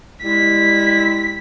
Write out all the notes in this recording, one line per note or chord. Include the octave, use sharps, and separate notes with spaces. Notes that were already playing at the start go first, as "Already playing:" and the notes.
G3 G#3 E4 B6